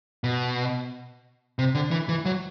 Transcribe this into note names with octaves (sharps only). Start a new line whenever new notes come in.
B2
C3
D3
E3
E3
F#3